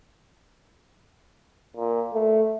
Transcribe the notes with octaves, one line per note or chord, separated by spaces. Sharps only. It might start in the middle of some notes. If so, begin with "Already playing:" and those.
A#2
A3